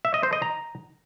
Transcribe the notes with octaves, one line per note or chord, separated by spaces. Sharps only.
E5
D#5
C5
D#5
A#5